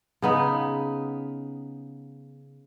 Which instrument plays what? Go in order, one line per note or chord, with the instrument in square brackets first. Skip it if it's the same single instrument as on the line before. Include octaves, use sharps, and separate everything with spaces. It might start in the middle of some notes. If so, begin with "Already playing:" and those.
[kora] C#3 B3 D#4